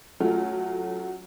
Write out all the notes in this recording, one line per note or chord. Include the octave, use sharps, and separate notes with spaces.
F#3 A3 C#4 F4